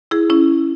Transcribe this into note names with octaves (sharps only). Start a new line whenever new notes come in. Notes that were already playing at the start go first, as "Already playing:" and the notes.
E4 G#4
C#4 E4